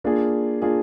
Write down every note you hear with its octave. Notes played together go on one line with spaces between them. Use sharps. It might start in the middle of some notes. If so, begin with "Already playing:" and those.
A#3 D4 F4 G#4
A#3 D4 F4 G#4